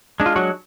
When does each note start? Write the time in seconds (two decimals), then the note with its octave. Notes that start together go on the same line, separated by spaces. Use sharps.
0.20 G#3 D4
0.26 F4
0.36 F#3 F#4